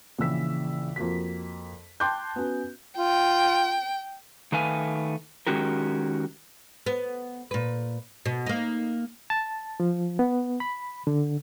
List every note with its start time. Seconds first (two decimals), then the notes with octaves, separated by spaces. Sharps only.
0.18 A#1 C#3 E3 E6 B6
0.96 F2 A#3 F#4 B6
2.00 G5 A5 C6 D6 F#6 G6
2.36 B3 C#4 F#4
2.98 F4 G5
4.52 D#3 A3 B4 F5 G#5
5.47 D#3 G#3 C#4 F#4 G4 A#4
6.86 B3
7.51 A#2 B4
8.26 B2
8.46 A#3 D#4
9.30 A5
9.80 F3
10.19 B3
10.60 B5
11.07 D3